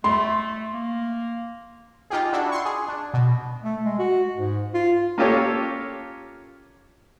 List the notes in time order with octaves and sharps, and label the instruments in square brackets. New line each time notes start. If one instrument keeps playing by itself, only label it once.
[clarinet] A3 [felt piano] C6
[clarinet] A#3
[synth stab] D#4 F4 G4 G#4
D4 E4 F#4
C6 C#6
G#4
D4
B2
[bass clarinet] A3
G#3
F#4
G#2
F4
[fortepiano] A#3 C#4 F4 G4 A4 C#5